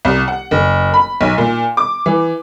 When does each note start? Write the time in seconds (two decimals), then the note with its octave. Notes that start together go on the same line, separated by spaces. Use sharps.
0.05 C2
0.28 F#5
0.51 F#1
0.94 B5
1.21 B1
1.38 A#2
1.77 D6
2.06 E3